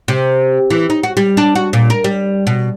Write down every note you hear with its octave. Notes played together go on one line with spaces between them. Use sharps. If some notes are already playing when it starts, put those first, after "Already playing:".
C3
E3
D#4
F#4
G3
D4
F#4
A#2
A#4
G3
B2